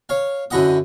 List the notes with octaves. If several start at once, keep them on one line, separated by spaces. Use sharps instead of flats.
C#5 F5
F#2 D3 E4 D#5 F#5 D#6